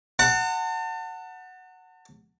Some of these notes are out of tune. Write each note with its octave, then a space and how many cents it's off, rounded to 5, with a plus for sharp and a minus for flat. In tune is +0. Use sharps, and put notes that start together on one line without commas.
F#5 +0 A5 +40